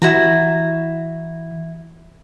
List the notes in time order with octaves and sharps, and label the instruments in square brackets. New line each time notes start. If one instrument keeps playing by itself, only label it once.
[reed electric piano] E3 [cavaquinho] E4 F#4 A#5